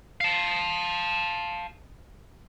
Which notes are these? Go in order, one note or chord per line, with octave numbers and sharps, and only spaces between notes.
F5 A5